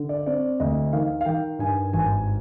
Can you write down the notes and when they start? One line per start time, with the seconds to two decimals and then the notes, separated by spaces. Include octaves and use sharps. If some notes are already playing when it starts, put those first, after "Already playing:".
Already playing: D3
0.09 D5
0.26 C4 D5
0.60 D2 D#5
0.93 D#3 F5
1.21 F5
1.26 D#3 G5
1.59 G2 G#5
1.93 G#1 G#5